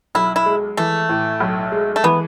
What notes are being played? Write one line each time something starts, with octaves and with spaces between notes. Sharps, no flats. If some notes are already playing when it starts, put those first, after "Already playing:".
B1 E4
E4
G#3
E3 A3
A2
B1
G#3
A3
E3 B3